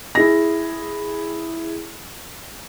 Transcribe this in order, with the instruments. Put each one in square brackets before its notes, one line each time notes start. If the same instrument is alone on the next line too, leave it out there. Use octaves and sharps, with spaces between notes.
[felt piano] E4 G#4 A#6